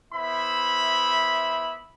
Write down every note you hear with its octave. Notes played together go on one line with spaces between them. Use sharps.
B3 E4 C5 E5 B5